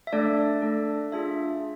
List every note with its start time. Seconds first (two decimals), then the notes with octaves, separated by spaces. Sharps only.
0.07 E5
0.13 A3 D4 A4 D5
0.62 A3 D4 A4
1.12 D4 F4 G#4 E5